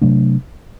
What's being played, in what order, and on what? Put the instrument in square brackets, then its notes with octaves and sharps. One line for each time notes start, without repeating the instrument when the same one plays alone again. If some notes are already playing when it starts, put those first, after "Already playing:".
[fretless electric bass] C3 F#3 A3 D4